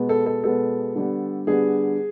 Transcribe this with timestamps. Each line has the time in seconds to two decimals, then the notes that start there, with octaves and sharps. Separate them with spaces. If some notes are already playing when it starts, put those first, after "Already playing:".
Already playing: B2 G#3 B3
0.09 A4
0.26 A4
0.44 B2 G#3 B3 A4
0.96 D3 G3 B3
1.47 D3 G3 B3 G#4